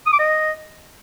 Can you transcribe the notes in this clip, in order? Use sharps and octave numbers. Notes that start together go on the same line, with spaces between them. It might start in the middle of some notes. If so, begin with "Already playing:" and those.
D#6
D6
D#5